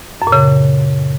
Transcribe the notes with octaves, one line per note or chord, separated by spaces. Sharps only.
F#2
A#2
C#3